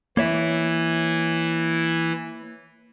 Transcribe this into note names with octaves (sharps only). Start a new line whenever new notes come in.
E3 A#3 E4 C#5 E5